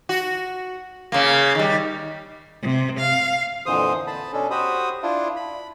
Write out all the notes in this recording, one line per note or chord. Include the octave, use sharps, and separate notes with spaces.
F#4
C#3 A#3
D#3 G3
C3
F5
F2 A#2 D3 E3 C5 D#6
A5 B5
B2 C#4 D4 A4
F#4 G4 C5 B5 D#6
D4 E4 F4
B5